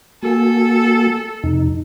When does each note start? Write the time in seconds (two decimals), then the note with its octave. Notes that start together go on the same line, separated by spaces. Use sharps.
0.23 A#3 F#4 A4 G#5
1.44 F2 C3 D#4